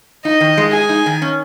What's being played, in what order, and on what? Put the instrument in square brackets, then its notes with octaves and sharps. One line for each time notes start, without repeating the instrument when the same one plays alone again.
[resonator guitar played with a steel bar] D#4 [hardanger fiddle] D#5
[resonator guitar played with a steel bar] D#3
G#3
[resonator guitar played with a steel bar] G#4 [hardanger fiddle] G#5
[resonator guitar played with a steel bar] D#4
D#3
C#4